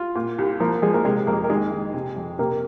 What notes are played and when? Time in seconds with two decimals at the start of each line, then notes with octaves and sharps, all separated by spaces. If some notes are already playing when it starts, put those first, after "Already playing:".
Already playing: F4
0.16 A#2
0.38 C2
0.60 F3 A#3 A#4
0.82 F3 G#3 G#4
0.93 A#3 A#4
1.05 C3 G#3 G#4
1.27 F2 A#3 A#4
1.44 A#4
1.49 D#3 G#3 G#4
1.71 D#3
1.93 C3
2.16 F2
2.38 C3 A#3 A#4